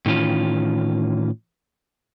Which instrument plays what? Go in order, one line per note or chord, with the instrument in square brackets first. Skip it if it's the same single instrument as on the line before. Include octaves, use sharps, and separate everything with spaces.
[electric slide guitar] A2 D#3 E3 C#4 F4